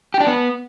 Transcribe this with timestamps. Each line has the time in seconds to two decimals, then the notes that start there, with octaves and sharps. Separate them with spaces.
0.14 G4
0.20 D4
0.27 B3